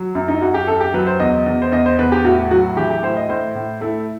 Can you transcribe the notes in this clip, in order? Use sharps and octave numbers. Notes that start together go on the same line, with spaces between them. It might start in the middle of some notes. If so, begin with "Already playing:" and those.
Already playing: F#3
F#2
D#4
F#2 F#4
G4
F#2 A4
G4
F#3 B4
C5
E2 D#5
E2
C5
E2 D#5
C5
E2 B4
G4
A2 F#4
F#3 F#4
E3 G4
G4
A2 C5
D#5
A2 C5
A2
A3 E4